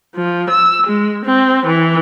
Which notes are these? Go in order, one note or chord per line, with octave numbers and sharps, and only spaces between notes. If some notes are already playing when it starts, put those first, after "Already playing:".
F3
E6
G#3
C4
E3